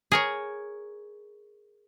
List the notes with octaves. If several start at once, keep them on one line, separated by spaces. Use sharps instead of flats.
G#4 A#4 C#5